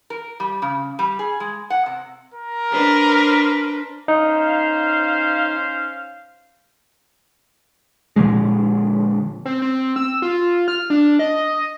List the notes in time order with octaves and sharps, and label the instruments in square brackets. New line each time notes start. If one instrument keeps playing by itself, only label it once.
[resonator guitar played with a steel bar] A#4
G3
C#3
G3
G#4
G#3
F#5
C3
[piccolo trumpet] A#4
[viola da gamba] D4 B4 C5
[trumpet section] C#4 C5 F5 [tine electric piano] D#4
[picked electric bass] A#2 D3 F3 G#3
[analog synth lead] C4
C4
E6
F4
F6
D4
D#5